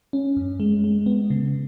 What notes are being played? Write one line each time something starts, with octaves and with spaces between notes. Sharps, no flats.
C#4
F#2
G#3
G#3
B3
C#3